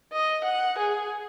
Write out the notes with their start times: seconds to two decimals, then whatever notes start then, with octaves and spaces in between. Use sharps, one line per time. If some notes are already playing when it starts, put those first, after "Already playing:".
0.13 D#5
0.44 F#5
0.78 G#4